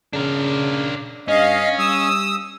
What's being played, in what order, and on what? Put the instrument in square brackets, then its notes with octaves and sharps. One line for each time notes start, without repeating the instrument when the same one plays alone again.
[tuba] C#3 [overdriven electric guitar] D4 A#4
[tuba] G2 [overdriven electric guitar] C#4 [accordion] D#5 F5
[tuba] G3 [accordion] D#6 E6